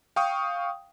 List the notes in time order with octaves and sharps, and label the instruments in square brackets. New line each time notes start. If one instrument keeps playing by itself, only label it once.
[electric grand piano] F5 G5 C#6 D#6